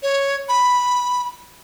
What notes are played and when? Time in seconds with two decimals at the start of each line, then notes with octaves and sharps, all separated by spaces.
0.03 C#5
0.49 B5